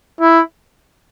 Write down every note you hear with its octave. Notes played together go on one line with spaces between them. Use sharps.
E4